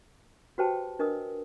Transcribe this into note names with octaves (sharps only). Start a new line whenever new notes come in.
F#4 G4 B4 C5 G5 A5
D4 A#4 B4 D#5 D#6